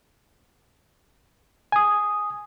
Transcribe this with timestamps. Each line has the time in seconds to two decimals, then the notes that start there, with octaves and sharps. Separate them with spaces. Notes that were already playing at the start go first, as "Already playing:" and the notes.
1.72 G#5 D#6